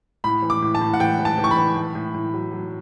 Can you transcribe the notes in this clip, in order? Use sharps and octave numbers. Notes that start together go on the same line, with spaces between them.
A2 B5
E3
D6
A2
A5
A2
F#5
E3 G5
E3
A5
E3
C#6
B5
E3
A2
A2
A2
F#3
F#3